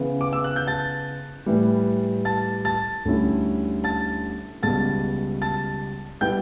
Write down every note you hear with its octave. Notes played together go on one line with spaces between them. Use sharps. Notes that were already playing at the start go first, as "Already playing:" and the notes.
Already playing: C#3 E3 B3
D6
E6
F#6
G6
A5 A6
A2 E3 G3
A5 A6
A5 A6
D2 D3 G3 C#4 E4
A5 A6
C#2 B2 G3 A5 A6
A5 A6
B2 G3 B3 E4 G5 G6